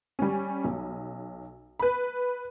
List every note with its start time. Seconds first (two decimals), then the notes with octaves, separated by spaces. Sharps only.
0.19 G3 C#4
0.64 B1
1.80 B4 B5